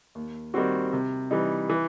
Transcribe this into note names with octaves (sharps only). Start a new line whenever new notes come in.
D#2
D#3 G3 C4 F#4
C3
E3 G3 D#4
E3